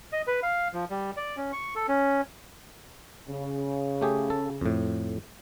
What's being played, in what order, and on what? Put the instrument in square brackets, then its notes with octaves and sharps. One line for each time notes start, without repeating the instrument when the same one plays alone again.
[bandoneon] D#5
B4
F5
F3
G3
D5
C#4
C#6
A4
C#4
[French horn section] C#3
[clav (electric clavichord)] A3 G4 G#4
A4
F2 A2